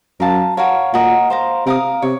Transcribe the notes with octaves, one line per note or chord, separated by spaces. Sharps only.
F#2 A#4 F5 A5
F#4 A#4 C#5 F5
A#2 F#4 A#4 D#5
C5 F5 A#5
C3 A#4 F5 A#5 D#6
C3 C#5